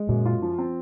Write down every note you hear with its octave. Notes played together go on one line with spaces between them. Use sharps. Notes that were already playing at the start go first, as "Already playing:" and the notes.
Already playing: G#3
F#2 A#2
F4
F3
C4